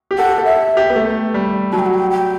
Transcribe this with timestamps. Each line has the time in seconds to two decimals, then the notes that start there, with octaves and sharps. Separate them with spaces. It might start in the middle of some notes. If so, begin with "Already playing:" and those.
0.11 G4
0.18 A4 F#5
0.38 A4
0.45 E5
0.77 G4
0.89 B3
0.96 A3
1.34 G3
1.72 F#3 A5
1.79 G5
1.86 F#5
1.94 G5
2.11 G5